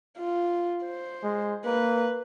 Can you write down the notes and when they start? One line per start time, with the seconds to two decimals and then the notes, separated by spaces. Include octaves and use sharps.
0.18 F4
0.85 C5
1.24 G#3
1.65 A#3 B4